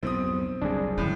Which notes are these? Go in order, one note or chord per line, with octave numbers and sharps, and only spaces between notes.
B1 F2 G#2 C4 D#6
F#1 C2 F#2 D4 G#4
A2 D#3 C#4